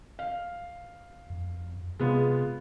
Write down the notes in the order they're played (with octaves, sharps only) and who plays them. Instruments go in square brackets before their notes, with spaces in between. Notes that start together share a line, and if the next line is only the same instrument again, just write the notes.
[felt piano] F5
[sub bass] F2
[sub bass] C3 [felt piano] G#3 B3 F4